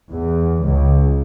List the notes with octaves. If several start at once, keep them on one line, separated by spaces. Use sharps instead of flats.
E2
C#2